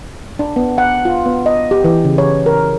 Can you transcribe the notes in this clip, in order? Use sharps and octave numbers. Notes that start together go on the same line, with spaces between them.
D4
B3
F#5
F4
B3
D#5
G4
E3
C#3
C#5
A#4